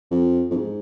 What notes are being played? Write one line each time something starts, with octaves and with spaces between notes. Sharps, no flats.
F2
F2
G#2